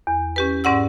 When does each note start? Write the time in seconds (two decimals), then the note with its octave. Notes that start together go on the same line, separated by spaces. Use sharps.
0.07 E2
0.36 C#4 G4 B4
0.64 G#2 C#4 D5 F#5 E6